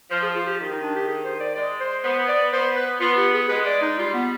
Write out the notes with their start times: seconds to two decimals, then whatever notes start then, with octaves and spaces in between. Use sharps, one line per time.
0.10 F3 C5
0.23 G#4
0.35 F4
0.47 G4
0.59 D#3 G4
0.72 D#4
0.83 D4
0.96 G4
1.07 G#4
1.24 C5
1.40 D5
1.55 G#3 D5
1.80 C5
2.04 B3 C5
2.28 D5
2.52 B3 C5
2.76 B4
3.00 B3 F4
3.17 G4
3.34 G#4
3.49 G#3 B4
3.66 D5
3.82 D#4
3.97 G3 F4
4.14 B3